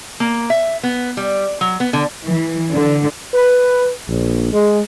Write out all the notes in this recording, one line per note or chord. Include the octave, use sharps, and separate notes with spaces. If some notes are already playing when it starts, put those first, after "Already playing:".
A#3
E5
B3
G3
F#3
B3
D3
E3
D3
B4
A#1
G#3